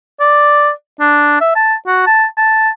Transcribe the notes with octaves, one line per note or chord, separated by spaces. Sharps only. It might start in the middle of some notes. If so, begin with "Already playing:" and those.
D5
D4
E5
A5
F#4
A5
A5